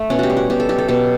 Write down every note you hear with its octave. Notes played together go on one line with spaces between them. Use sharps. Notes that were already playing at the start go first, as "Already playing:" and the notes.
Already playing: A3
B2 C#4
F#4 G4
G3
F#4
B2 G4
A4
F#3 G4
A4
B2 G4